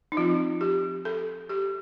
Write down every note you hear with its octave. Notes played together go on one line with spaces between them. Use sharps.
D#4
F3 C4 F4
G4
A4
G4